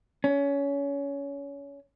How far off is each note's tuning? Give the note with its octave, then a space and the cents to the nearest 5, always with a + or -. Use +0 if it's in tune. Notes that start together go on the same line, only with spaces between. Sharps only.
C#4 +25